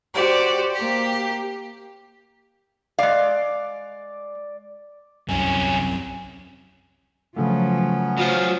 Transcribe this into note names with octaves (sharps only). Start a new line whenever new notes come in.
F#4 G4 C5 D5
A#3 G4
G#3 D5 F5
C2 F#2 C3 F#3 C#4 G#5
C#3 F3 F#3 A3 B3 C#4
F#3 F4 C5